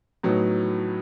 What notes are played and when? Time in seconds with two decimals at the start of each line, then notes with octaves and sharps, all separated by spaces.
0.23 A2 F#3 B3 D#4